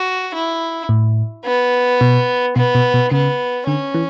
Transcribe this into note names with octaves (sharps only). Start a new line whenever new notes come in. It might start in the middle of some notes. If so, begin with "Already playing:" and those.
Already playing: F#4
E4
A2
B3
B2
B2 B3
B2
B2
C#3 B3
D3 C#4
E3